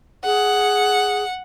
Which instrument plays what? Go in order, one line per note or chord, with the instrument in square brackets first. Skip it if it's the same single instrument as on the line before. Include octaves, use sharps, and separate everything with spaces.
[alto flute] G#4 [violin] F#5